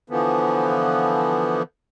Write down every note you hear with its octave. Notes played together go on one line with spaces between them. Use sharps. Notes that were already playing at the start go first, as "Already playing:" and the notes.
D3 E3 F3 B3